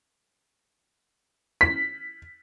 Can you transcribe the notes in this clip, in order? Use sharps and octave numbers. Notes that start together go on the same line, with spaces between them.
B6